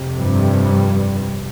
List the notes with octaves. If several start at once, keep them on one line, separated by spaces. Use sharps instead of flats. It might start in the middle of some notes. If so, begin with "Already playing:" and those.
Already playing: F2 C3
G2 G3